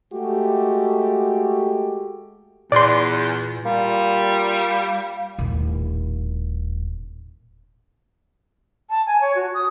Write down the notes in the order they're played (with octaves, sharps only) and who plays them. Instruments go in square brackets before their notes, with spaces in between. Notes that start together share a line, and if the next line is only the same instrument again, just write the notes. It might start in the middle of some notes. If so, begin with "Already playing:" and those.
[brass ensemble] G#3 A3 F#4 G4
[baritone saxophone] E2 [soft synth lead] A#2 [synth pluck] D5 C6
[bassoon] A#2 [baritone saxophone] G3 [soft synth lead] F5
[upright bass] D#1 A2
[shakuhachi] A5
G#5
C#5
F#4
D#6